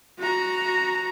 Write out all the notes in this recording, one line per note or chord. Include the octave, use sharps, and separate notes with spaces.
F#4 A#5